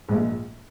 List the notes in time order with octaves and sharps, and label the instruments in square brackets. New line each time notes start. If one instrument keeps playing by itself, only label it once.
[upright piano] A#1 A#2 F3 [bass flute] G#3